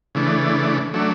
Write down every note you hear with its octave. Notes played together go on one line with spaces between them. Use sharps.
C#3 E3 A3 D4
F#3 A3 D4